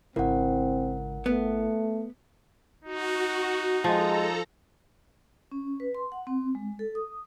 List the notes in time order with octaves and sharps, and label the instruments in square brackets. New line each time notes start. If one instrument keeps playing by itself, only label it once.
[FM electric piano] G#1 E4 [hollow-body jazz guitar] C#2 [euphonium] C4 [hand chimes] A#4 F#5
[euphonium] A3 [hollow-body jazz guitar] B3
[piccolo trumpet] D#4 [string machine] F#4
[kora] F3 [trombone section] G#3 [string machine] A4 A#5
[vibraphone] C#4
B4
C6
F#5
C4
G#3
A4
D#6